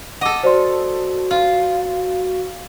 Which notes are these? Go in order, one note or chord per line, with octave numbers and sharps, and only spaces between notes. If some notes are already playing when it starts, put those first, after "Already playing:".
A4 D#5 F#5 D6
F#4 C5 D5 C6
F4